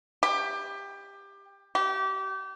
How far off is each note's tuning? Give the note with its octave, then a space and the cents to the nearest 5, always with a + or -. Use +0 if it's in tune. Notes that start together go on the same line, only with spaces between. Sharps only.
G4 +20
G4 -30